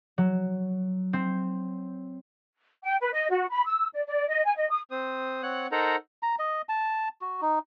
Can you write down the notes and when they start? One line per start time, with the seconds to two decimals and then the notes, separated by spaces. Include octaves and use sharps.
0.18 F#3
1.13 C4
2.83 G5
3.00 B4
3.14 D#5
3.29 F#4
3.51 B5
3.66 E6
3.93 D5
4.08 D5
4.28 D#5
4.44 G#5
4.57 D#5
4.69 D#6
4.91 C4 C5 D#6
5.43 C4 C#5 F#5 F#6
5.72 D#4 A4 A#4 C5 F#5 A#5
6.23 A#5
6.39 D#5
6.69 A5
7.22 F#4
7.41 D#4